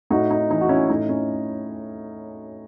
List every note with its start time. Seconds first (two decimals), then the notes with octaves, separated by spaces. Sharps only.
0.10 A2 D#4 F#4
0.31 D#4
0.50 E3 D#4
0.61 F#4
0.69 C#4 E4
0.89 A2 D#4
1.09 C#4